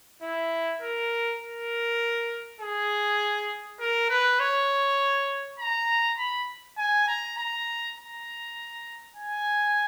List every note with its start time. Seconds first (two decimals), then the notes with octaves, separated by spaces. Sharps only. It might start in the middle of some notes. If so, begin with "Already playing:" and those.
0.22 E4
0.82 A#4
1.41 A#4
2.60 G#4
3.79 A#4
4.09 B4
4.40 C#5
5.59 A#5
6.18 B5
6.78 G#5
7.08 A#5
7.37 A#5
7.96 A#5
9.16 G#5